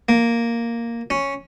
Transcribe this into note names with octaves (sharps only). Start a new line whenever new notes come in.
A#3
C#4